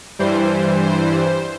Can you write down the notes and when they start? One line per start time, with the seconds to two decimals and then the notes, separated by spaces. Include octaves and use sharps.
0.19 G2 E3 G3 C5
0.82 C5